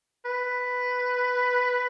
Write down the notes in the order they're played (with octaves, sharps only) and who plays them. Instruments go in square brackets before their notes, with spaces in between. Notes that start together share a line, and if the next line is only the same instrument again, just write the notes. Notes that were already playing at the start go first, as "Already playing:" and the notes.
[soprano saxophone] B4